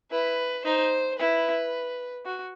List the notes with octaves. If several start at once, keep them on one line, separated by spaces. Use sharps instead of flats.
E4 B4
D#4 C5
E4 B4
F#4